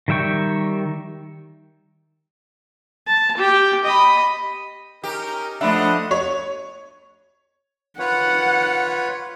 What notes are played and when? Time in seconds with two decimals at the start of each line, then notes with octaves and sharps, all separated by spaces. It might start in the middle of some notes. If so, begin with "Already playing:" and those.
0.08 D#3 G3 E5 G5 C#6
3.07 A5
3.37 G4 G5
3.84 D#5 B5
5.04 C#4 D#4 G4 A#4
5.61 F3 A3 D4 D#5 E5 F#5 B5
6.11 C#5
7.99 F4 B4 C#5 F#5